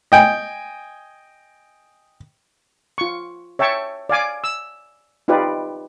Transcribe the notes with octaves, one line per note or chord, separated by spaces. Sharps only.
D#5 G5 G#5
F4 C#6
C#5 E5 G5 A5 C#6
D5 F5 G#5 D6
E6
D#4 F4 G4 B4 D5